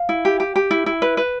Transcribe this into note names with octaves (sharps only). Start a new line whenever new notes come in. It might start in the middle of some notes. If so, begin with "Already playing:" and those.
Already playing: F5
E4
G4
G4
G4
E4
E4
B4
B4